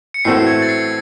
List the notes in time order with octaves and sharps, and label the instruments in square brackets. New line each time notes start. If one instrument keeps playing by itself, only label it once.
[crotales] C#7
[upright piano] A2 E3 A3 C4 F#4 [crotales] C7
[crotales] G#6
A6
C7